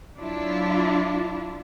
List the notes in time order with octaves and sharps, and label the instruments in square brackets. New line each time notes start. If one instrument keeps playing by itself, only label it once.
[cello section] F#3 D4 E4 F4